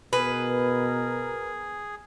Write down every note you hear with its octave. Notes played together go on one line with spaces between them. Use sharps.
B2 G#4 A#4 B4